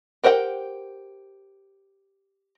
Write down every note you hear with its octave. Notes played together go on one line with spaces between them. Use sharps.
G4 A#4 C5 F#5 G5